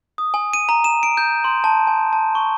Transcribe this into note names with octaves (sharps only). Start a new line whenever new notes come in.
D#6
G#5
D#7
A#5
E7
D7
G6
C6
A5
G#5
A5
C#6